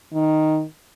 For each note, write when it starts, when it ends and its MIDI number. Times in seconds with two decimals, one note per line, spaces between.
0.13 0.63 51